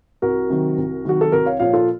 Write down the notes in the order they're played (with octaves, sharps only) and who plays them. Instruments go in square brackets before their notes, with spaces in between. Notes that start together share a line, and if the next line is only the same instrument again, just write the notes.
[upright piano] C2 F#4 A#4
C3 D#3 F#3
C2
C3 D#3 F#3 F#4
A4
C2 F#4 A#4
C#5 F5
A#2 F3 C#5 F5
F4 A4